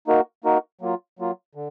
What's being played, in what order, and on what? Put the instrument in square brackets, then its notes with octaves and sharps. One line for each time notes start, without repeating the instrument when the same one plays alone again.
[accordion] A#3 D#4 F#4 A#4
A#3 D#4 F#4 A#4
F#3 A#3 F4
F#3 A#3 F4
D3